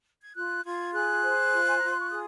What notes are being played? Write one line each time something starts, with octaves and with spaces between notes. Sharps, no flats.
G#6
F4 F#6
F4 G#6
G#4 F#6
C5
F4
G#5
F4 A#5
C6
C#6
G#4 D#6